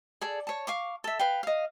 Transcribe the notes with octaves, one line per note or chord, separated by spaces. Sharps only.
G#4 A4 D5
C#5 A5
F5 C#6 D6
A4 E5
B4 F5 G5
D#5 F5